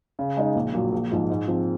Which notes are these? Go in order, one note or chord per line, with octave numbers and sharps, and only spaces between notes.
C#3
G#3 D#4
A#1
A#2 F#3
A#1
G#2 F3 G#3
G#2
F3 C4